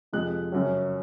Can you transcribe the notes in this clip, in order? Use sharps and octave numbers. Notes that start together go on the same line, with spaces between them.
F2 C3 F3 G#3 F#6
F#2 C#3 F#3 C#4